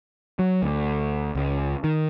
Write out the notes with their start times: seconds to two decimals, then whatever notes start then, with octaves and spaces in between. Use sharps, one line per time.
0.39 F#3
0.63 D2
1.35 C#2
1.84 D#3